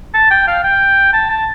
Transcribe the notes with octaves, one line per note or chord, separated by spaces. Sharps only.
A5
G5
F5
G5
A5
A5